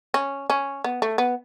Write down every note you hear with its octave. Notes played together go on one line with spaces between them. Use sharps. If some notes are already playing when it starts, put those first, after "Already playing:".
C#4
C#4
B3
A3
B3